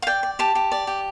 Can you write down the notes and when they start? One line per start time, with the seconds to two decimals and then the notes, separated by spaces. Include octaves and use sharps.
0.02 F5
0.07 D5 G5
0.23 D5
0.39 G4 A5
0.55 G4
0.72 D5
0.87 G4